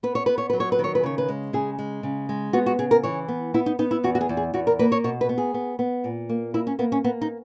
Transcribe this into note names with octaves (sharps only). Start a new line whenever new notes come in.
B3 B4
C#5
B3 B4
C#5
F#3 B4
C#5
B4
D#3
C#5
B4
C#3 C#5
B4
G#3
C#3 G#4
G#3
C#3
G#3
B3 F#4
F#4
C#3 G#4
A#4
E3 C#5
B3
B3 E4
D#4
B3 D#4
E4
E2 F#4
F#4
G#4
E2
G#4
E2 F#4
A#4
A#3 B4
C#5
B2 C#5
B4
B3
G#4
B3
B3
A#2
A#3
A#3 E4
C#4
A#3 B3
C#4
A#3 B3
D#4